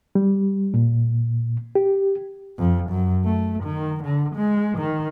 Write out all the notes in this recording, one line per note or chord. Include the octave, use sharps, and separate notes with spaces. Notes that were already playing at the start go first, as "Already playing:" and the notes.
G3
A#2
G4
F2
F#2
A3
D#3
D3
G#3
D#3